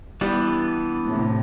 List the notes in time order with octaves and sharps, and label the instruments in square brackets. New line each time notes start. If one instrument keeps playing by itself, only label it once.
[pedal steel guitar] E3 B3 D4 [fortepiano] G3
[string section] A2 C3